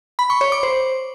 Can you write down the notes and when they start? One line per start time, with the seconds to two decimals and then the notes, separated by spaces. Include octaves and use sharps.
0.19 B5
0.30 C#6
0.41 C#5
0.52 D6
0.63 C5